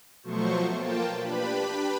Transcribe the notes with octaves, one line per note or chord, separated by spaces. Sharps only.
B2 F3 F#3 A3 C5 C#6
A#3 F4 G5 A5
D4 G4 B4 B5